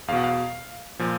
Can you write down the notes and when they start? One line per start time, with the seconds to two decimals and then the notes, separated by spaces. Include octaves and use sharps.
0.08 E2 F5
0.13 B2 F#5
0.24 F5
0.99 A#2 F3